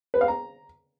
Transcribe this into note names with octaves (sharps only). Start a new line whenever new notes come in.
B4
F5
A#5